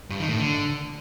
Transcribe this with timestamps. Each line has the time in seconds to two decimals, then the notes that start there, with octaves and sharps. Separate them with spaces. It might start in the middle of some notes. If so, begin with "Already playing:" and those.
0.10 G2
0.20 D#3
0.29 A2
0.38 D3